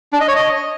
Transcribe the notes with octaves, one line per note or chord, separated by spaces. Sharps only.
D4
D#5
C#5
D#5